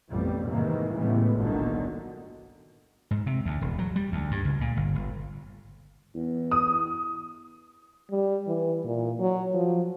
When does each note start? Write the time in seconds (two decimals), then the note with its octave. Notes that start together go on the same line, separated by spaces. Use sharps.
0.10 A1 F2 B2 G3
0.48 G#2 C3 D#3 E3 A#3
0.94 A2 C#3 E3 G3 G#3 B3
1.35 G1 C2 A#2 D3 D#3 F#3
3.11 G#2
3.26 C3
3.45 D2
3.61 E1
3.79 F#3
3.96 G3
4.12 D2
4.31 G2
4.45 C#2
4.61 A#2
4.77 G1
4.95 G1
6.14 E2
6.51 D#6
8.10 G3
8.47 E3
8.85 A#2
9.19 F#3
9.54 F3